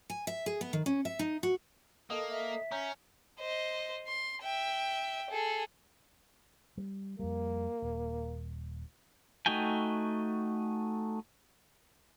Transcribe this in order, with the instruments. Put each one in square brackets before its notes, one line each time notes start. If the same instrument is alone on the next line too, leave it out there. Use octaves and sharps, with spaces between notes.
[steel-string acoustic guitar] G#5
E5
G#4
B3
D#3
C#4
E5
D#4
F#4
[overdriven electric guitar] A#3 [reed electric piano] A4 D#5 D#6
[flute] E5
[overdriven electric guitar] C#4 [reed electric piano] A#5 G6
[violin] C5 D#5
C6
E5 G5
G#4 A4
[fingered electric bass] G3
[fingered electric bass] F2 G3 [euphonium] A#3
[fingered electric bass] D#1
[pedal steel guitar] A3 D#4 F#4 G5 G#5